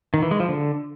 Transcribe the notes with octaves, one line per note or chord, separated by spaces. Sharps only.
D#3
E3
G#3
F3
D3